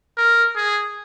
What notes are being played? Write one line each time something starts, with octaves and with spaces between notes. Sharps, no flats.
A#4
G#4